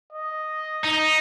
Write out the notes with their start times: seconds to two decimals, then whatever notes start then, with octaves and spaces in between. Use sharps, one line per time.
0.13 D#5
0.85 D#4